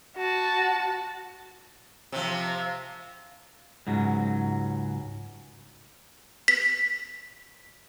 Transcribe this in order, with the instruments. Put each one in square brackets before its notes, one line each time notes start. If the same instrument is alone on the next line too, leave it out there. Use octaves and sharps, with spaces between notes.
[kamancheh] F#4 A5
[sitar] C3 F3
[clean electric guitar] C#2 G#2 F#3
[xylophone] B6